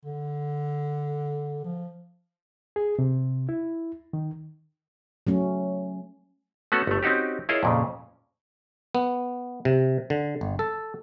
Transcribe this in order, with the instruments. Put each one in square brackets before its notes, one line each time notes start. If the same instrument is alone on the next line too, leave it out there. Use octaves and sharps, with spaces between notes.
[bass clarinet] D3
F3
[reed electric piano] G#4
C3
E4
D#3
[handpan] F#3 A3 C#4
[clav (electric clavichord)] A3 B3 C#4 F#4 A4
G1 A3
C4 C#4 D#4 F#4 G4
E4 F4 G#4 A#4 C#5 D#5
F2 A#2 C#3
B3
C3
D3
G1
A4